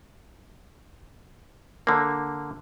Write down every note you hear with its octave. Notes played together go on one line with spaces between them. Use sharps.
D3 A#3